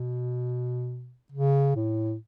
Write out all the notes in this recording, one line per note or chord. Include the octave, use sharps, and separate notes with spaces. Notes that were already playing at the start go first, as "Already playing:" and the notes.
Already playing: B2
C#3
A2